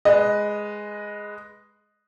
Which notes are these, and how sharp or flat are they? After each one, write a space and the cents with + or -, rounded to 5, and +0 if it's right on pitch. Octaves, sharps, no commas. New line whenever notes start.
G#3 +0 B4 +0 D#5 +0